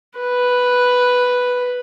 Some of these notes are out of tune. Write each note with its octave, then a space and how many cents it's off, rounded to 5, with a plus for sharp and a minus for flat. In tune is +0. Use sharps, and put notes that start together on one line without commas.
B4 +0